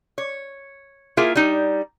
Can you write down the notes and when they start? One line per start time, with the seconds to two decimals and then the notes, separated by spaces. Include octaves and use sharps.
0.18 C#5
1.17 A#3 E4 F4 G#4 A#4 E5
1.35 G3 D#4